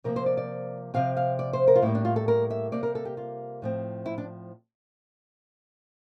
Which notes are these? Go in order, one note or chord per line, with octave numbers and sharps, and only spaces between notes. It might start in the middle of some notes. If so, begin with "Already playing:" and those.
C3 F3 A#3 A#4
C5
D5
D5
C3 F3 C4 F5
F5
D5
C5
A#4
F4
A2 G3 A#3 E4
D4
F4
A4
A#4
E5
C3 G3 A#3 D5
A#4
A4
G4
F4
A2 F3 C4
E4
D4